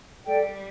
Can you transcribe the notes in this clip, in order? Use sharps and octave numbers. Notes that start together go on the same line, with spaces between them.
G3 A4 D5 G5